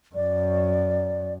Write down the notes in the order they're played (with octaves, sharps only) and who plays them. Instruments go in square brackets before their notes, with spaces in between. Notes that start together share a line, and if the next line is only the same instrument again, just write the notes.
[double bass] F#2 [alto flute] D5